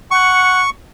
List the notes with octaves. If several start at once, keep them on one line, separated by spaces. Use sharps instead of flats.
F#5 C#6